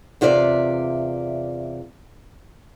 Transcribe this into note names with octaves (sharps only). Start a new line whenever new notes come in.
E2 C3 F4 D5 E5